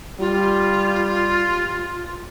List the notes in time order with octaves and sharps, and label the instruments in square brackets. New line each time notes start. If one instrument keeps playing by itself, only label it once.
[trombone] G3 [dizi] F4